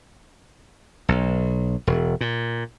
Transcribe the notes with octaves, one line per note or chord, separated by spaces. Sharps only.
B1
E1
A#2